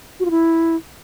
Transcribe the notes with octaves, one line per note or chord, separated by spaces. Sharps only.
F#4
F4
E4